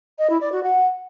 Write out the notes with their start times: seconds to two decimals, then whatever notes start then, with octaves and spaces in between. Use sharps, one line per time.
0.19 D#5
0.30 E4
0.41 D5
0.52 F#4
0.63 F#5